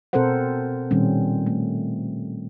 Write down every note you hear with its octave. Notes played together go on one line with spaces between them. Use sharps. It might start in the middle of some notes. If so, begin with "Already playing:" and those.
B2 C4 A4 A#4 C5 F#5
A#2 D#3 G3 C4 C#4
A3